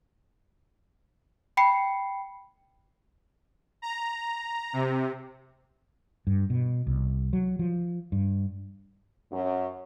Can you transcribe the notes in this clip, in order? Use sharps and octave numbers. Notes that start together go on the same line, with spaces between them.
G5 B5 C7 C#7
A#5
C3
G2
B2
C2
F#3
F3
G2
F#2